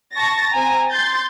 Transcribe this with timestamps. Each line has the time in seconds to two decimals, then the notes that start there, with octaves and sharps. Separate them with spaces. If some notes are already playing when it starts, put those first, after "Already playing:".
0.14 A5 C#6 A6 A#6
0.53 C4 G#5 A#5
0.91 C6 G6 A6